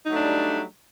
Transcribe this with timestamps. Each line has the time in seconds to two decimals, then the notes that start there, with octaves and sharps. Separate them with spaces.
0.05 D#4
0.09 F#3
0.13 A3
0.16 D4
0.20 G3